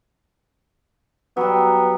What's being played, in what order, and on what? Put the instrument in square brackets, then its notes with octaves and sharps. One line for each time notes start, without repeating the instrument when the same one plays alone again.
[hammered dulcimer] F#3 G3 [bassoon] B3